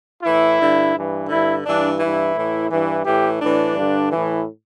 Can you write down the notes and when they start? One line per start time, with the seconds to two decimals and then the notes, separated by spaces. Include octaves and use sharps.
0.23 A2 E3 E4
0.58 G2 D3
0.94 G2 E3
1.29 G2 D3 E4
1.64 G2 E3 D4
2.00 G2 E3 E4
2.34 A2 E3
2.69 G2 E3
3.04 A2 E3 G4
3.40 A2 E3 D4
3.75 G2 D3
4.10 A2 E3